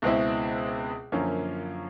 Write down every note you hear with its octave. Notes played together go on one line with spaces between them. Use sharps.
C#2 B2 G#3 C4 E4
F#2 D3 F3 A#3 C#4